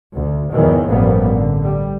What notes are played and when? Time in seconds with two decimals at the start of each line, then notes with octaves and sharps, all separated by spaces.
0.15 D2
0.51 E2 G#2 D#3 E3 F#3
0.88 A1 G2 F3 G3 A#3 B3
1.28 D3
1.63 G3